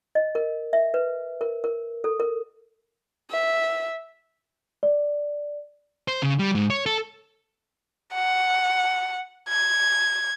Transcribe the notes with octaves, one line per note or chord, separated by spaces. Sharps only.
D#5
A#4
E5
B4
A#4
A#4
A4
A#4
E5
D5
C5
C#3
G3
G#2
C#5
A4
F#5
G#6